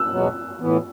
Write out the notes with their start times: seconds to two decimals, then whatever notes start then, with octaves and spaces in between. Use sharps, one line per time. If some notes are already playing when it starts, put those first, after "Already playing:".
Already playing: E6 F#6
0.10 E2 B2 F#3 B3 F#4
0.60 A2 E3 B3